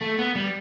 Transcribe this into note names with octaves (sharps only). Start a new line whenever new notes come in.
A3
B3
G3